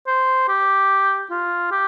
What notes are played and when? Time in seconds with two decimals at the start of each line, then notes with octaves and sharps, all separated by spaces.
0.07 C5
0.48 G4
1.31 F4
1.72 G4